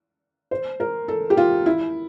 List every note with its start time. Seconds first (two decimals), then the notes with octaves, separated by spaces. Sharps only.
0.51 C5
0.80 A#4
1.08 A4
1.30 G4
1.37 F4
1.66 E4